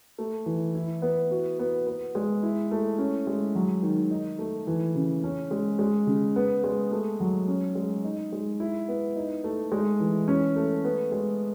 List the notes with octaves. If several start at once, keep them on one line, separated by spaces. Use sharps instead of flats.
A3
E3
E4
B3
F#4
B3
B3
G#3
E4
A3
C#4
G#3
F#3
D#3
D#4
A3
E3
C#3
C#4
G#3
G#3
C#3
B3
G#3
A3
F#3
C#4
G#3
D#4
G#3
E4
B3
D#4
A3
G#3
E3
C#4
A3
B3
G#3